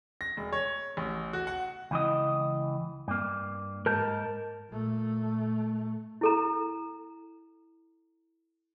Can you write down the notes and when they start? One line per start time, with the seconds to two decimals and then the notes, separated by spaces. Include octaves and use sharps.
0.21 A#6
0.37 E1
0.53 C#5
0.97 A1
1.33 F#4
1.47 F#5
1.91 C#2 E3 D#5
3.08 G2 A#3
3.86 G#2 A#4 A5 G6
4.70 A#2 A3
6.21 E4 A4 A#5